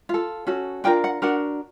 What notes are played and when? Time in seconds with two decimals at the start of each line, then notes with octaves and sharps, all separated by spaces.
0.09 F4 A4
0.47 C#4 F#4 A4
0.84 D4 F4 A#4 G5
1.04 F#5
1.22 D4 F#4 A#4 F#5